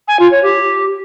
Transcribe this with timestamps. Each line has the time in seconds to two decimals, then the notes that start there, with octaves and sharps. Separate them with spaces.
0.08 G#5
0.20 F4
0.31 C#5
0.43 G4